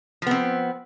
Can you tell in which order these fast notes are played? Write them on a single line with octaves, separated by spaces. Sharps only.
F3 B3 C4